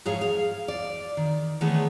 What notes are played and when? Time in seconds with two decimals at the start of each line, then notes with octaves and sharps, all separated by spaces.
0.05 G#2 F3 G#4 C#5 F5
0.21 F5
0.68 D5
1.17 D#3
1.61 D#3 E3 A3 B3 G#4 C#5